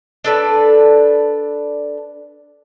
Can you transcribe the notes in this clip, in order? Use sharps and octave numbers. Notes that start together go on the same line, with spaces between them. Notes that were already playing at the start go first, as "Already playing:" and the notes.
D4 A4 B4 D5